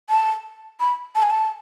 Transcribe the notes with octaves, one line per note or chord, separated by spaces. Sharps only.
A5
B5
A5
G#5
A5